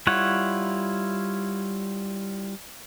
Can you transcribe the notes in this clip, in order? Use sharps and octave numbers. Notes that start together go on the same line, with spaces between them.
G3 E4 F4 C#5 F#5